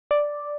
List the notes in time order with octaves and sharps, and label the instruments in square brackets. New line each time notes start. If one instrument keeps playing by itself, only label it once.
[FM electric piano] D5